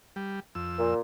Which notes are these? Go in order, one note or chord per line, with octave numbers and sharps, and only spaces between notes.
G3
F2 E6
A#2